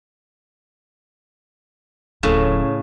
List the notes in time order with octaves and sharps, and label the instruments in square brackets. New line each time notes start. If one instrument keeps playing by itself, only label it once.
[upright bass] D1 F3 [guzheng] A2 C#3